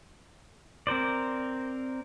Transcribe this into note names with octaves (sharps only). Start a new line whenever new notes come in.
C4 A#4 C5 D5